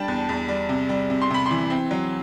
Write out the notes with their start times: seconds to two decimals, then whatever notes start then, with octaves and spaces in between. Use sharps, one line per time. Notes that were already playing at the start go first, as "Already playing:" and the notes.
Already playing: G3 D4 G5 A5 B5
0.08 E2
0.29 E2
0.48 G3
0.69 C3
0.89 G3
1.10 C3
1.22 C6
1.30 C3 B5
1.46 E3 C6
1.70 C4
1.91 F#3